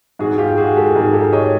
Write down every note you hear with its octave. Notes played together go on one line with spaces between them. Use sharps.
G#2 F#4 G#4
F4 G4
G#3 F#4 G#4
G4 A4
G#2 G#4 A#4
G4 A4
G#3 C#5 D#5